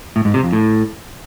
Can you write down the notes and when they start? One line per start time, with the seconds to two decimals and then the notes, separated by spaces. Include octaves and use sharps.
0.16 A2
0.25 G#2
0.34 C3
0.43 F2
0.53 A2